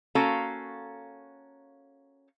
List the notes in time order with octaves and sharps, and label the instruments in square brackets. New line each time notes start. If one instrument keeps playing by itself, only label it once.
[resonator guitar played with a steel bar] A#3 C#4 F#4 A4 F5 A#5